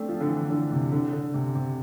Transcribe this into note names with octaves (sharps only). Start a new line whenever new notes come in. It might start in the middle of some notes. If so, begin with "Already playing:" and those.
Already playing: A3 C4 D4
F3
D3
E3
D3
C3
D3
D3
C3
C3